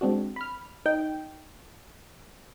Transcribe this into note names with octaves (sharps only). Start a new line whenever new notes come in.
G#3 C4 D4 F#4
B5 F6
D#4 G5